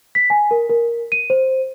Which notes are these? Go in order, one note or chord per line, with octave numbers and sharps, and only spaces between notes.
B6
G#5
A#4
A#4
D#7
C5